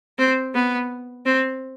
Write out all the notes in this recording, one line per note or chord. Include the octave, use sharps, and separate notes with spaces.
C4
B3
C4